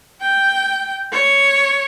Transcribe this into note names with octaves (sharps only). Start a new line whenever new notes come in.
G5
C#5